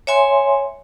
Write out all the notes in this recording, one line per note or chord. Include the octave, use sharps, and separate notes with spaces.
C#5 E5 G#5 C6